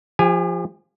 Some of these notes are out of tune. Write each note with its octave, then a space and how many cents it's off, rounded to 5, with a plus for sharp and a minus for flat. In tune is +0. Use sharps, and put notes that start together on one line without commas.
F3 +0 G4 +40 G#5 +0